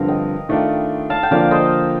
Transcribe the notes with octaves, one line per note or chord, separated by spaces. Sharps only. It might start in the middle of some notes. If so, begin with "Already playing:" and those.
Already playing: G2 D3 F3 C4 A#4 F5
D#5 G5
D#3 A3 D4 F4
F5 A5
G5
D3 F3 A#3 F4 D5 F5
C5 D#5